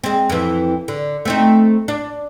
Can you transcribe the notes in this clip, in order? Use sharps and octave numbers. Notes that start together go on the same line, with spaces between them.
G#3 C4
F2 E3
D3
A3 C4 D#4
D4